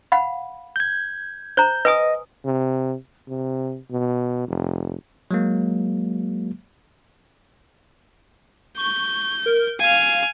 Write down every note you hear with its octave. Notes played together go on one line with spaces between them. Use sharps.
F5 F#5 B5
G6 G#6
C5 A#5 G6
B4 D#5 G#5 D#6
C3
C3
B2
F1
F#3 G#3 A#3
C#6 G6
A#4
F5 G#5 F6